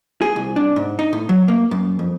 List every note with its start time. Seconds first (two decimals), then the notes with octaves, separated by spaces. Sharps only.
0.22 G#4
0.36 C2
0.56 D4
0.76 G#2
0.99 D#4
1.13 A2
1.29 F#3
1.48 A#3
1.71 F#2
1.99 F2